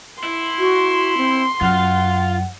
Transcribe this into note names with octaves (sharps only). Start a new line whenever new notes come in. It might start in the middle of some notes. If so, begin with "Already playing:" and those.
E4 C6
F#4
C4
F#2 F4 F5 F#5